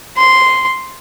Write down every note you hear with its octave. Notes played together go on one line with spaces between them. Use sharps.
C6